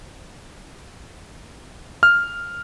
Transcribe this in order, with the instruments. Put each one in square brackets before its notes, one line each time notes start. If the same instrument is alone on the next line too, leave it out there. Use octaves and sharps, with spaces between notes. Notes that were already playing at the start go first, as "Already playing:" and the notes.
[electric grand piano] F6